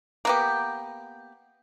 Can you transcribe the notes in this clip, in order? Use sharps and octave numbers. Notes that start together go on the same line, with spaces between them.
A#3 B3 G4